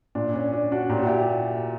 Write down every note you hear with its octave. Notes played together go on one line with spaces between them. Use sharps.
A#2 D4
C#4
D4
D4 F#4
A#2 G4
F#4
E4 G4